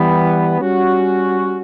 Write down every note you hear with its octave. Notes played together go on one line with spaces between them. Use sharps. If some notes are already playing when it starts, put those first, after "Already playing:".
Already playing: E3 G3 B3
G3 C#4 F#4